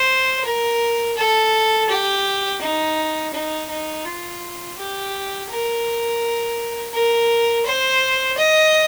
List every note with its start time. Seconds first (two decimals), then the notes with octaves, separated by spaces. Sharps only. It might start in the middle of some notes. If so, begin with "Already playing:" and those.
Already playing: C5
0.45 A#4
1.17 A4
1.90 G4
2.61 D#4
3.34 D#4
3.70 D#4
4.06 F4
4.78 G4
5.50 A#4
6.93 A#4
7.66 C5
8.38 D#5